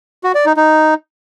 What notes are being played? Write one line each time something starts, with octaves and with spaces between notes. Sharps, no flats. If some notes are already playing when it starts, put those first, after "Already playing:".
F#4
D5
D#4
D#4